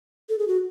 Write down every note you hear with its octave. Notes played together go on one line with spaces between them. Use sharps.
A4
G#4
F#4